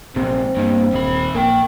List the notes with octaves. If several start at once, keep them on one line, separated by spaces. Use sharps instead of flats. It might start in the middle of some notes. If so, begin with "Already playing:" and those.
A#1 E2 G#2 C3 C4
E2 G2 A#3
D#1 D#3 B5
A#1 A#3 A#4 G5